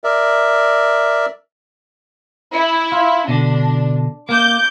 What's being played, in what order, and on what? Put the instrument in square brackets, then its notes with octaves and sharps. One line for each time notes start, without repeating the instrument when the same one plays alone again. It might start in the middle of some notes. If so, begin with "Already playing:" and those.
[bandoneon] A#4 D5 E5
[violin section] E4
[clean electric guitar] F4
[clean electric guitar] B2 D3 [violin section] D4
[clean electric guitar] A#3 [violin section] D6 G6